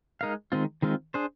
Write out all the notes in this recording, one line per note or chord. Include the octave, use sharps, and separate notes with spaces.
G#3 D#4 A#4 F5
D#3 G#3 C4 F4
D#3 G#3 C4 F4
D4 G#4 C5